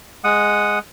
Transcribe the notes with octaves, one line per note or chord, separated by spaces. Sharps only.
G#3 F#5 D#6